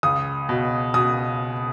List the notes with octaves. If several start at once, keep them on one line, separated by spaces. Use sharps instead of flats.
C#2 D#6
B2
B2 D#6